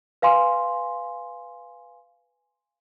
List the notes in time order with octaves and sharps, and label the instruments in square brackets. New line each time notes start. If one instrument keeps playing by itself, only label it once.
[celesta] B4 F5 G#5 C6